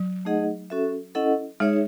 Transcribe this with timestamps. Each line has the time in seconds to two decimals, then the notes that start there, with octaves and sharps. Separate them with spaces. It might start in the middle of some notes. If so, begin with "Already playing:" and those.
Already playing: F#3
0.25 A3 D#4 G#4 D#5 F#5
0.70 C#4 F#4 A4 E5
1.15 C#4 E4 A4 D#5 F#5
1.60 G#3 D#4 G#4 C#5 E5